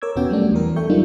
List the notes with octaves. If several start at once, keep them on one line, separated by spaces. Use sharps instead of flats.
A#4 C#5 D6 E6 G#6
E2 B2 B3 C#4 F#4 G5
F#3 G3 A3 D4
E2 E3 A#4
A4 E5 G5 C#6 G6
F#3 G3 A#3 D4 D#4 F4